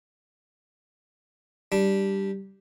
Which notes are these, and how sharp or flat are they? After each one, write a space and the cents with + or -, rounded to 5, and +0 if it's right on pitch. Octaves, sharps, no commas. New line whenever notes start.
G3 -5 D4 +0